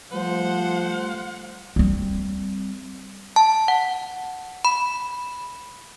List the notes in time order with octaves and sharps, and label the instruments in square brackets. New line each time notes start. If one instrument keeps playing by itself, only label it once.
[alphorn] F3 [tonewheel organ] G3 A3 [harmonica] C5 [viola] F#5
[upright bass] G3 C4
[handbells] A5
F#5
B5